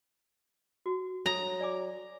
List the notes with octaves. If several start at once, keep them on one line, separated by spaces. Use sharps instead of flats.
F#4
F#3 A4 A#5 D#6
D5 G#5 D6